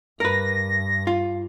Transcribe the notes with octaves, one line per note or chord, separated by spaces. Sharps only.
G2 A#4 B4 A#6
F4